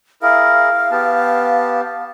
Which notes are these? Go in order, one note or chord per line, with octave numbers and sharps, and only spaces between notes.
E4 G#4 A#4 F5
B3 G4 A5